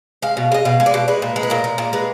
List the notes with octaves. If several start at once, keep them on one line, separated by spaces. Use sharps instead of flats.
G#3 F5
B2
G#3 D#5
B2 F5
G#3
D5
B2
G#3 B4
A#2
G#3
B4
A#2 A#4
G#3
A#2
G#3 B4